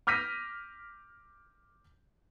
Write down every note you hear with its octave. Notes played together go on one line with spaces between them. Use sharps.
D6 F6 G6 A#6 B6 D#7